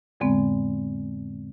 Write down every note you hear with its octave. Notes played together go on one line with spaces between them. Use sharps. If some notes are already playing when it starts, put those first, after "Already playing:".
F2 A2 D3 G#3 B3 C4